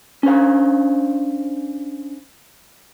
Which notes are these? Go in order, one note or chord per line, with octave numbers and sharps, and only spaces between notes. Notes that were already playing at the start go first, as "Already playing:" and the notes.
C#4 D4 C5 F5